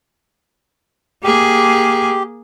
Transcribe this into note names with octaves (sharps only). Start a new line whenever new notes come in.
A#3 G4 G#4